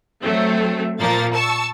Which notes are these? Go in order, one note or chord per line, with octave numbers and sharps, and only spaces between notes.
F#3 A3 C4
A#2 F3 A#3 A6
A5 C#6 E6